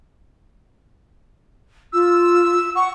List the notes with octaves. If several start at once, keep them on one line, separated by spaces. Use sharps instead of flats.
F4 E6
F#5 C#6